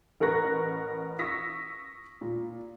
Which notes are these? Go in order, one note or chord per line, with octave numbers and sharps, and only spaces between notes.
A1 A#4 B4 C#6 F#6 A#6
C#6 D#6 E6 A#6 B6
A#2